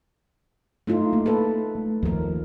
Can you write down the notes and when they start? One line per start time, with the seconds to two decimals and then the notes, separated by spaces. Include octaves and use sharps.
0.87 A3 D#4 F4
1.13 A3 A#3
1.26 A4 B4
1.75 A3
2.03 D#2 F3 A#4